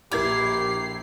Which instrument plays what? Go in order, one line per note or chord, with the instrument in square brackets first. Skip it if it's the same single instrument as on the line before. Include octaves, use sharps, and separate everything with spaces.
[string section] A#1 C7 [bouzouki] E4 [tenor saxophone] G4 [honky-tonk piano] A#4 G#6 F7